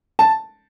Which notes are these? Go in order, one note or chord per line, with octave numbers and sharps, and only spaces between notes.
A5